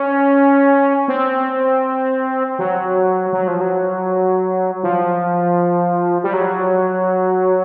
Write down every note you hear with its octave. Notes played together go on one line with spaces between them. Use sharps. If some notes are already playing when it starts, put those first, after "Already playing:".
Already playing: C#4
C4
F#3
F#3
F3
F#3
F3
G3
F#3